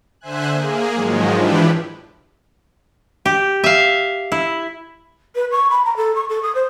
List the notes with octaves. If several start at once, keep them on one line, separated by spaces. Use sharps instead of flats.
D3 C5 E5 G#5 F#6
A#3 G#4
G#2 D#3 F3 F#3 G#3
E3 F3 D4 E4 G4 B4
G4
E5 F5
E4
B4
C#6
B5
A#5
A4
C#6
A4
D#6
C5